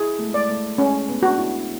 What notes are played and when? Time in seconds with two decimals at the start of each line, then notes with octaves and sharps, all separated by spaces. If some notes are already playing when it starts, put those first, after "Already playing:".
Already playing: E4 G#4
0.19 A3
0.26 G#3
0.33 A3 D5
0.49 A3
0.78 G#3 C#4
1.09 B3
1.23 D4 F#4
1.38 E4